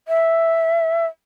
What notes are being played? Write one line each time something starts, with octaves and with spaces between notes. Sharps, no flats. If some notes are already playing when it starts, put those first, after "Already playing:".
E5